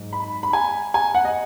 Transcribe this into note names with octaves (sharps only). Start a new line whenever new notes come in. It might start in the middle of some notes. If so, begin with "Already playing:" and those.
Already playing: G#2 F#3
B5
B5
G#5
G#5
F#5
D#5